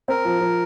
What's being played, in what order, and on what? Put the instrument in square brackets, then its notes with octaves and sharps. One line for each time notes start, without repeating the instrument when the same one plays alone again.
[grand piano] C4 [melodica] A#4
[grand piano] F3
F3